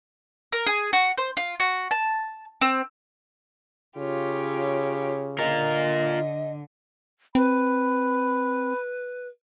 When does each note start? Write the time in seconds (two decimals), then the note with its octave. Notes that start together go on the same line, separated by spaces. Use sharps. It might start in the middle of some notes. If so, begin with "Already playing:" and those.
0.52 A#4
0.67 G#4
0.93 F#4
1.18 C5
1.37 F4
1.60 F#4
1.91 A5
2.61 C4
3.97 C#3 F4 G4 C#5
5.39 D3 F4 A#4 D#5
7.35 C4 B4 B5